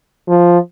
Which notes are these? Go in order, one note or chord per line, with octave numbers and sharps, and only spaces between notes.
F3